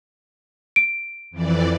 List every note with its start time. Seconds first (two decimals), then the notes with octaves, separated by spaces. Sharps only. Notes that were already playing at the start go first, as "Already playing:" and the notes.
0.76 D7
1.31 F2 E3 D5